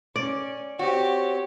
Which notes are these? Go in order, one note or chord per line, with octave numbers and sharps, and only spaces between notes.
C#4 D5
C4 F#4 G4 C#5